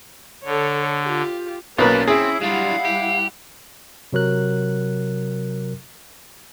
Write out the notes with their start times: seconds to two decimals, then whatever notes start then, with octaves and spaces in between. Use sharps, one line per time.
0.45 D3 A4 C#5
1.02 F4 G4
1.78 B1 A#3 C#4 F4 B4 D5
2.08 C4 E4 G#4
2.41 F#3 G3 D4 E4 F4 F5 F#5
2.85 G4
4.13 C3 F#3 A#4 F#6